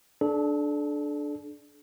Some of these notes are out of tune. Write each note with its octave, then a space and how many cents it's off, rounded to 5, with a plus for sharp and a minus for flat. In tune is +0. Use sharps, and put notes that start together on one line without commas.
D4 +5 A4 -35